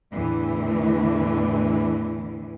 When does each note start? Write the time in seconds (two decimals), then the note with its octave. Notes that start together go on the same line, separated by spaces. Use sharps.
0.12 E2 A2 D3 E3